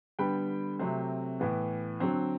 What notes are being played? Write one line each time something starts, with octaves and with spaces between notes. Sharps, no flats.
D3 G3 B3 G5 B5
C3 F#3 A3 C4
A2 E3 B3
D3 F#3 C4